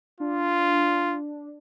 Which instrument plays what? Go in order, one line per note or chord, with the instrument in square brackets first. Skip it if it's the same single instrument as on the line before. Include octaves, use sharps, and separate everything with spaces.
[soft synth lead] D4 [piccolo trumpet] F4